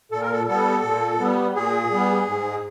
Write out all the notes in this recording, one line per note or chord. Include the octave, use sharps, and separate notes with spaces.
A#2 A4
A#4
A4
G3 B3 A4
A#2
G3 B3
A#2 G#4
G3 B3
G#2